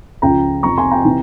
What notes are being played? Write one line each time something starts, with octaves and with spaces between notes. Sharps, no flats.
C#2 C#3 F3 G5 A#5
F2 C3 F3 A#5 C#6
G#5 C6
G5 A#5
C3 E3